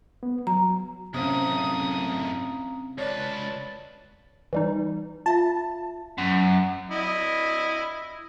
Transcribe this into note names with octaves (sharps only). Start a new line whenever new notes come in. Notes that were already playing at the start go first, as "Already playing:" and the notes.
B3
F#3 A#5
F#2 A2 C3 C4 C#4 F5 A#5 D#6
C#2 B4 C#5 D5 A5
E3 G3 D#4
F4 E5 F5 A5
F#2
E4 D#5